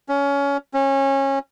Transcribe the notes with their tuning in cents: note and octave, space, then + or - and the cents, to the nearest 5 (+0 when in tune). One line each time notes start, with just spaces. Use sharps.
C#4 +20
C#4 -25